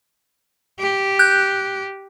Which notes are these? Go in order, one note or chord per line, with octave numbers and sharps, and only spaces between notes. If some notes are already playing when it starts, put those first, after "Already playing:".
G4
F#6 G6